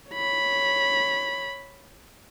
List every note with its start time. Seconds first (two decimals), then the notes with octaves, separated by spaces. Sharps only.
0.11 C#5 B5